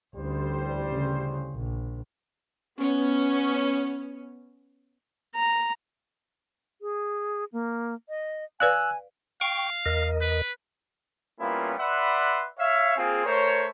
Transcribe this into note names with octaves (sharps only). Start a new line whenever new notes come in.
A1 D2 G3 C5
C#3
A#1
B3 C#4
A#5
G#4
A#3
D#5
B4 D5 F5 G#5 E6 F#6
F5 G5 C#6
E2 A#4 D#5
B4
G3 A#3 B3 C#4 E4 F4
B4 D5 E5 F#5 B5 C6
C#5 E5 F5
A#3 C4 F4 G#4
A3 A#4 C5 C#5